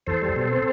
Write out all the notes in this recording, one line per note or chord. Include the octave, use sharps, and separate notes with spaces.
E2 A4 C5
G3
B2
C4